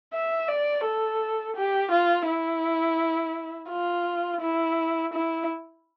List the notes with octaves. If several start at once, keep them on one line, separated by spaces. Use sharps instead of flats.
E5
D5
A4
G4
F4
E4
F4
E4
E4